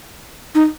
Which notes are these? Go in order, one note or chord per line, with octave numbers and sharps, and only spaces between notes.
D#4